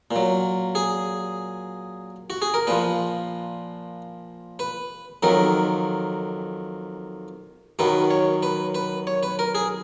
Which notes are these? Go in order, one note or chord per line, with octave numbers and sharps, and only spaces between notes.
A#2
F#3
G#4
F#4
G#4
A#4
A#2 F3 B4
B4
F2 D#3 F#3 A#4
F#2 D#3 F#3 B4
C#5
B4
B4
C#5
B4
A#4
G#4